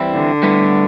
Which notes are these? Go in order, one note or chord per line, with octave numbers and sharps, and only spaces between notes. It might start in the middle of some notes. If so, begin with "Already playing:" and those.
Already playing: E3 G3 C4 E4
D3
A2 G3 B3 E4 B4